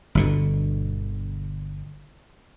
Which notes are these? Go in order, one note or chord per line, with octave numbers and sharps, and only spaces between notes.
G1 B2 D3